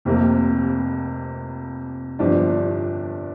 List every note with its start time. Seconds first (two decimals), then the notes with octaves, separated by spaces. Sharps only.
0.05 F1 F2 C3 A#3
2.19 G1 G2 F3 D4